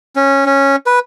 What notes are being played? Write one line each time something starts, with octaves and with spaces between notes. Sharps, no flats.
C#4
C#4
B4